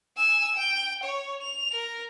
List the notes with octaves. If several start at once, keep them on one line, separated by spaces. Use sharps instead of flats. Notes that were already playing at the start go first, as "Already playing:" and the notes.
G#5 E6
G5
C#5
F7
A#4